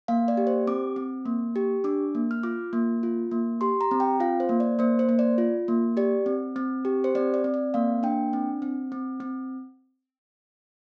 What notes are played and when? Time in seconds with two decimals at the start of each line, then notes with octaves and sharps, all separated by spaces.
0.08 A#3 F5
0.28 D5
0.37 G4
0.47 C5
0.67 C4 D6
0.96 C4
1.26 A#3
1.56 G4
1.84 D4 D6
2.15 A#3
2.31 F6
2.43 F4 D6
2.73 A#3
3.03 F4
3.31 A#3
3.61 G4 C6
3.81 A#5
3.91 C4
4.00 G5
4.20 F4 F5
4.40 C5
4.49 A#3
4.60 D5
4.79 A#3 C5
4.99 C5
5.09 A#3
5.19 D5
5.38 F4
5.68 A#3
5.97 G4 D5
6.26 C4
6.56 C4
6.85 G4
7.04 C5
7.15 C4 D5
7.34 D5
7.44 C4
7.54 D5
7.74 A#3 F5
8.03 D4 G5
8.33 C4
8.62 C4
8.92 C4
9.20 C4